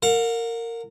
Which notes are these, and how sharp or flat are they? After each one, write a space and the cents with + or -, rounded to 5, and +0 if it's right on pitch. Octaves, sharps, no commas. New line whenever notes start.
A#4 -20 F#5 -45